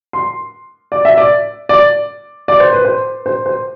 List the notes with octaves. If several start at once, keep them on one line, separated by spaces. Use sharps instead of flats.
C6
D5
E5
D5
D5
D5
C5
B4
C5
C5
C5